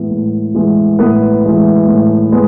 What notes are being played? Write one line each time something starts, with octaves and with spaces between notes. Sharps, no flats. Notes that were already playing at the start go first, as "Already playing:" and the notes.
Already playing: A2 E3 G#3 B3
A2
E3 G#3 B3
A2 B3 B4
E3 G#3 B3
A2
G#3 B3